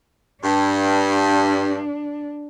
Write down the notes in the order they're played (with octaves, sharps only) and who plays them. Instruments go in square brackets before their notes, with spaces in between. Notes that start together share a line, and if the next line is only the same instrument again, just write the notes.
[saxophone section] G2 [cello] D4